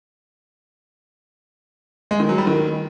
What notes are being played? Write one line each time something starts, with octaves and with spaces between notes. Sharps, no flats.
G#3
D#3
F#3
G3
D#3